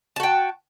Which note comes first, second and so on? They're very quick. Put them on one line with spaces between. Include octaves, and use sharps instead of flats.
A5 F#4 G5